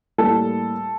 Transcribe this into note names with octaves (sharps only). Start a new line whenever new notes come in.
A2 G3 A#3 A4